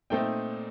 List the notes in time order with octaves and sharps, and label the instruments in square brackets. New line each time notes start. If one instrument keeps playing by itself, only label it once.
[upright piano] A#2 A3 C4 D#4 G5